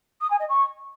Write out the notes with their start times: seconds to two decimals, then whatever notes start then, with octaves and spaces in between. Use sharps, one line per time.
0.21 D#6
0.30 G#5
0.39 D#5
0.49 C#6